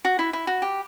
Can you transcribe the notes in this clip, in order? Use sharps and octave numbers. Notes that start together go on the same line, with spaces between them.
F#4
E4
E4
F#4
G4